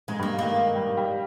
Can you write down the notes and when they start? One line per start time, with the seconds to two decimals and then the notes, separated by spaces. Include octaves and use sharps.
0.08 G#2 G#3
0.19 G2 A#3
0.39 D#3 A#3
0.75 G3
0.97 G3